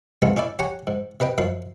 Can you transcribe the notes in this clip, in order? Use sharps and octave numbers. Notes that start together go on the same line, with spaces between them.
C3 G#3 A3 B3 F4
C#4 D#4 E4 D5
G4 C#5 F#5 G#5 A#5
G#2
C3 B4 D#5 G5
F#2 F3 D#4 C6